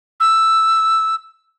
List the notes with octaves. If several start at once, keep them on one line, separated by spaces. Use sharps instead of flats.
E6